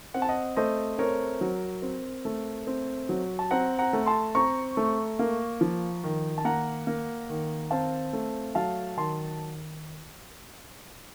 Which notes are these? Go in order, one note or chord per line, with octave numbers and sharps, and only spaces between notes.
C4 F#5
A5
D#5 F#5
A3 C5 D#5
C4 A#4 C#5
F#3
C4
A3
C4
F#3
A5
C4 F#5 A#5
F#5 A#5
A3
A5 C6
C4 A#5 C#6
A3
A#3
F3
D#3
A5
A#3 F#5 A#5
A#3
D#3
C4 F5 A5
A3
F#3 F5 A5
D#3 A5 C6